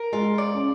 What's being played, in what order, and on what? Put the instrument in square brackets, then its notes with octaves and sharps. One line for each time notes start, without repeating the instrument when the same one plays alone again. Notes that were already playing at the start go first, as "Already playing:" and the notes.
Already playing: [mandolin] A#4
[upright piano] G#3 [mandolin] F4
[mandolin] D5
[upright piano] C#4